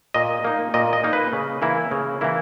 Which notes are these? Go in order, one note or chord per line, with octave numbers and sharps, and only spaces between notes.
A#2 D#5
A#3 D#4
A#2 D#5
D#5
A#3 D#4
B4
C#3
E3 A#3 E4
C#3
E3 A#3 E4